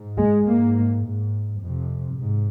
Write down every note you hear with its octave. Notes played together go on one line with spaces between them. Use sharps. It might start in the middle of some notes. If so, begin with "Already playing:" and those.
Already playing: G#2
G#3
G#2 A#3
G#2
F2 C3
G#2